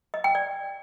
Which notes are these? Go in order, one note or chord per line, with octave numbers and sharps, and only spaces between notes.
D#5
G5
D5